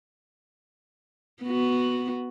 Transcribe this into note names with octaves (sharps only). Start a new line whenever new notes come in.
B3 F#4